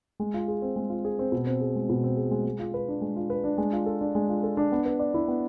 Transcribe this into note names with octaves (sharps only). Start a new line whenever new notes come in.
G#3
F4
G#4
C4
G#3
F4
G#4
C4
B2
C4
G#4
G#3
B2
C4
G#4
G#3
G#3
F4
B4
D4
G#3
F4
B4
D4
G#3
F4
A4
D4
G#3
F4
A4
D4
B3
B4
D5
E4
B3